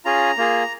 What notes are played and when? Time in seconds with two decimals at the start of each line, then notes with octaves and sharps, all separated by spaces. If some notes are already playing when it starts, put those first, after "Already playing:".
0.05 C#4 F4 G#4 A#5
0.38 A#3 F4 G#4